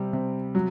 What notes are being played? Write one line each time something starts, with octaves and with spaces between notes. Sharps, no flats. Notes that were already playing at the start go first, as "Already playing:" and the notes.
Already playing: C3 G3
C3
F#3